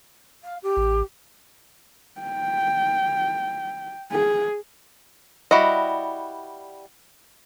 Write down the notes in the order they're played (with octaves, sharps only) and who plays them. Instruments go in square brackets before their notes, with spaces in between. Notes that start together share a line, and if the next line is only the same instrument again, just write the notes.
[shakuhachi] F5
G4
[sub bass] A1
[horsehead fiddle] G5
G#4
[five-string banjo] G3 E4 F#4 D#5